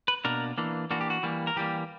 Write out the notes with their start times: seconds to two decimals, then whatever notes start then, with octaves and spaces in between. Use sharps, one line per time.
0.08 B4
0.25 B2 A#3 D4 A#4
0.58 E3 A#3 D4
0.91 E3 A#3 D4 F#4
1.01 G4
1.10 F#4
1.23 E3 G3 A#3
1.47 A#4
1.56 E3 G3 A#3 G4